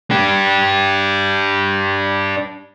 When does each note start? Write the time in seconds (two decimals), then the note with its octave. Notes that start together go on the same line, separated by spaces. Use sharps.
0.11 D4 G4